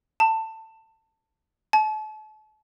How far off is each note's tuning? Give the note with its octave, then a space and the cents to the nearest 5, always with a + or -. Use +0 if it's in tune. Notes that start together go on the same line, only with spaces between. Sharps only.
A5 +20
A5 -35